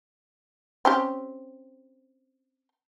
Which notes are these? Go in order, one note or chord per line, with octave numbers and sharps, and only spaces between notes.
C4 C#4 G4